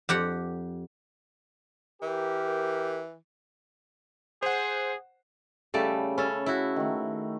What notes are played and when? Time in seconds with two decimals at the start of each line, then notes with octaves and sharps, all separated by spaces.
0.09 F2 G4 F#5
2.02 E3 G4 A#4
4.43 G#4 C5 F#5
5.74 C#3 G3 A3 A4 D5
6.18 C#4 A4 B5
6.46 E4 F#4
6.76 D#3 A3